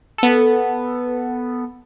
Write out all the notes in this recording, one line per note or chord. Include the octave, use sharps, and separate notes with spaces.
B3 A4